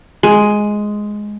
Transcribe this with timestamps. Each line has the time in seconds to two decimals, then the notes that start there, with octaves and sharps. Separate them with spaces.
0.23 G#3